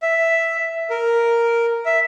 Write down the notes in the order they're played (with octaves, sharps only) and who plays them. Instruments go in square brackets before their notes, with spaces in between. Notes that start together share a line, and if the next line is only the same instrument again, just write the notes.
[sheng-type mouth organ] E5
A#4
E5